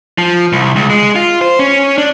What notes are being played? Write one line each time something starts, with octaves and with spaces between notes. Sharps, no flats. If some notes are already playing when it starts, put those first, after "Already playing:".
F3
C2
C#2
G#3
F4
C5
C#4
D4